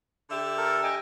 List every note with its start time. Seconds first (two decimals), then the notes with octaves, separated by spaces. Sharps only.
0.30 D3 G4 E5
0.58 A4 A#4
0.84 D#5 G5 G#5